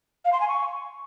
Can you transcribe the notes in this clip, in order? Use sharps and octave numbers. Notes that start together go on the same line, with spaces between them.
F5
C6
G#5
C#6